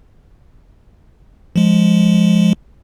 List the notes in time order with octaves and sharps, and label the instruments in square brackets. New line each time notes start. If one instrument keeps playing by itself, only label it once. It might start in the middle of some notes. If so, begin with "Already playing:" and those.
[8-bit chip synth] F3 G#3